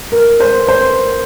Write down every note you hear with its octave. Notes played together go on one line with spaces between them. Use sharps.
A#4
C5
C5